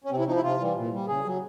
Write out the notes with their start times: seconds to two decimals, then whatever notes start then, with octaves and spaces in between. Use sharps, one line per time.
0.04 C#4
0.10 C3 C4
0.19 E4
0.27 F3 D#4
0.36 E4
0.43 C3 F4
0.60 E3 G3
0.75 A#2
0.93 G3
1.08 C#3 G#4
1.25 F#3